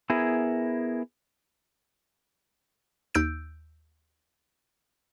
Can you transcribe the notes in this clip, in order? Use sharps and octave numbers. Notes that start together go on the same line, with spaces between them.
B3 E4 G#4 A#4
D#2 E6 G6 D7